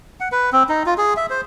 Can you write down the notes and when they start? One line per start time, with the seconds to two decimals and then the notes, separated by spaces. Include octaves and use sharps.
0.20 F#5
0.32 B4
0.53 C4
0.69 D#4
0.86 F4
0.98 G#4
1.17 E5
1.30 C5